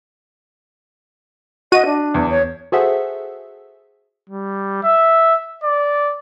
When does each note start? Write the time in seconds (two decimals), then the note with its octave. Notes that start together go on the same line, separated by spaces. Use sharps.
1.72 F#4 D#5 D#7
1.85 D4
2.14 E2
2.29 C#5
2.72 F#4 G#4 A4 C5 E5 F#5
4.30 G3
4.83 E5
5.64 D5